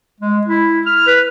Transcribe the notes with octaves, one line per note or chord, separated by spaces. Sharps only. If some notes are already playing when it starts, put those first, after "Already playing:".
G#3
E4
F6
B4